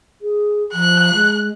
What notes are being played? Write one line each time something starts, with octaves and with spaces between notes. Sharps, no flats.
G#4
F3 F#6
G#3